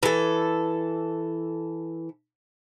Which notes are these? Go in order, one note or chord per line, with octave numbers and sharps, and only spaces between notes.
E3 A4